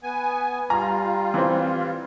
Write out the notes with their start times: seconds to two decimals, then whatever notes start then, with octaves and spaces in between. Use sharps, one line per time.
0.03 B3 G#5
0.70 G3 F4 A#5
1.34 E3 C4